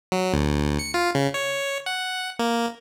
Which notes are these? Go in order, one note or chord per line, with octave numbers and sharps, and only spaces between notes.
F#3
D2
C#7
F4
C#3
C#5
F#5
A#3